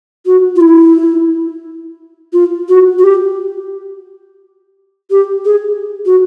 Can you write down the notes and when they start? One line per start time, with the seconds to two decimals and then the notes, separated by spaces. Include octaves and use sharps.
0.26 F#4
0.56 F4
0.61 E4
2.33 F4
2.69 F#4
2.98 F#4
3.04 G4
5.11 G4
5.45 G#4
6.06 F#4